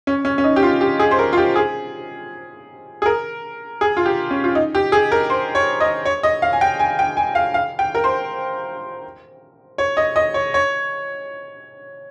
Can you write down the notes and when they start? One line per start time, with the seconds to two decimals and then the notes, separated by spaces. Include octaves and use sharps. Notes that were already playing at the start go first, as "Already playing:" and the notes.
0.07 C#4
0.25 C#4
0.38 C#4
0.44 D#4
0.56 G4
0.63 F4
0.81 G4
0.99 G#4
1.11 C5
1.19 A#4
1.33 F4
1.38 G4
1.56 G#4
3.02 G#4
3.06 A#4
3.81 G#4
3.97 F4
4.06 G4
4.31 C#4
4.44 F4
4.55 D#4
4.75 G4
4.92 G#4
5.12 A#4
5.30 C5
5.55 C#5
5.80 D#5
6.05 C#5
6.23 D#5
6.42 F5
6.53 G#5
6.61 G5
6.79 G#5
6.99 G5
7.17 G#5
7.35 F5
7.54 F5
7.79 G5
7.95 A#4
8.04 C5
9.78 C#5
9.97 D#5
10.16 D#5
10.34 C#5
10.54 C#5